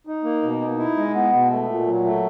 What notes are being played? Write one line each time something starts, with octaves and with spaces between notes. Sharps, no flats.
D#4
A#3
B2
D#4
E4
G#3
B3
B2
A3
A#2
F#3
A3